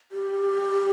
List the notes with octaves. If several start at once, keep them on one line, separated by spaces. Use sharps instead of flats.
G4